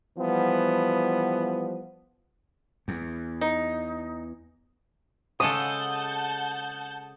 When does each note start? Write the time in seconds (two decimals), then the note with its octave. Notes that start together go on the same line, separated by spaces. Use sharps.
0.18 E3 F3 G3 B3
2.88 E2
3.41 D#4
5.40 C#3 G#3 A4 F#5 A5 D#6 G6